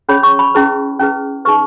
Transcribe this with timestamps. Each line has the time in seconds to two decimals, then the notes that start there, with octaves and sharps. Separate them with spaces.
0.09 C#4 G#4 C#5 B5
0.23 C#6
0.39 B5
0.54 C#4 E4 G#4 B4
1.00 C#4 E4 G#4 B4
1.45 D#4 G#4 B4 C#6